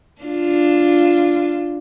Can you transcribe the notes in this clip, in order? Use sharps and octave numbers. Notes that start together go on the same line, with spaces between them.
D4 F4